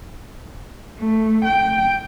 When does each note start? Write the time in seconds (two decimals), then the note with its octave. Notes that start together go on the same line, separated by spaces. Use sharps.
0.99 A3
1.45 G5